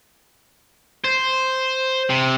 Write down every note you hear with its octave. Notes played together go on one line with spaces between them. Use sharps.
C5
C3